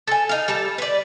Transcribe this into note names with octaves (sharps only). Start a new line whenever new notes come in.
A4 G#5
D#4 F5
G3 A4 A5
B4 D5